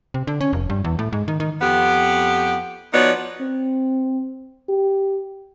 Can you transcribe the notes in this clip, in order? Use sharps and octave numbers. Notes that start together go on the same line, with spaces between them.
C3
D3
C#4
F1
G2
E2
A2
G#2
D#3
D#3
F2 B3 G4
F3 B3 D#4 F#4 C#5 D5
C4
G4